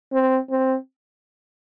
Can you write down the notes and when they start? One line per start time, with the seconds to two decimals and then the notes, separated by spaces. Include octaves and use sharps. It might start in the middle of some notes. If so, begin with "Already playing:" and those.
0.12 C4
0.50 C4